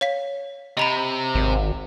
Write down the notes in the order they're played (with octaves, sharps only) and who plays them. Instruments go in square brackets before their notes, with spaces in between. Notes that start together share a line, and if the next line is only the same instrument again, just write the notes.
[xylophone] C#5 F5 B6
[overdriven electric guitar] C3 [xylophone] D#5 A#5 B5
[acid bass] G#1